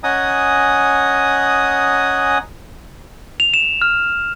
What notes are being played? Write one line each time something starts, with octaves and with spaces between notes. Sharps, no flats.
C#4 D#5 F#5 G#5 A#5 D#6
F7
E7
F6